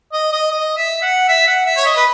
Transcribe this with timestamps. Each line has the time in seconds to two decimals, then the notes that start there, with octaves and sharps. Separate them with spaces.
0.13 D#5
0.32 D#5
0.51 D#5
0.77 E5
1.02 F#5
1.28 E5
1.47 F#5
1.66 E5
1.77 C#5
1.86 D#5
1.96 B4